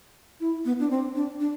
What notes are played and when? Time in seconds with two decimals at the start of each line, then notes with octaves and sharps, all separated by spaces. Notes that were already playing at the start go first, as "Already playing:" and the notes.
0.40 E4
0.65 B3
0.80 D4
0.91 C4
1.15 D4
1.40 D4